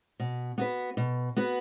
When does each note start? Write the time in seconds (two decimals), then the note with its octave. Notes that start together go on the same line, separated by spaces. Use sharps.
0.20 B2
0.58 B3 F#4 B4
0.97 B2
1.36 B3 F#4 B4